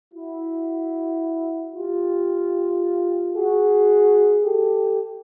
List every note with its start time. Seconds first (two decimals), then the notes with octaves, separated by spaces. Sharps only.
0.14 E4 F#4
1.75 F4 G4
3.36 F#4 G#4
4.43 G4 A4